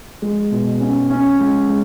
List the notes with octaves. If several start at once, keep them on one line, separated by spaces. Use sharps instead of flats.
G#3
B2
C#4
C#4
G#3
G#3